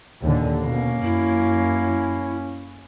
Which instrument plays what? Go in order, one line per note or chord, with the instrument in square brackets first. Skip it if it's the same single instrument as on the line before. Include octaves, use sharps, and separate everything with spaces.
[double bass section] D#2 A#2 D3
[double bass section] B2 [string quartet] A#3 [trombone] C#4
[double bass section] F#2 [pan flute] E4